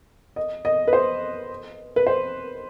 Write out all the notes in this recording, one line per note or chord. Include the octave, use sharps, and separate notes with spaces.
D#5
D#5
B4
C5
B4
C5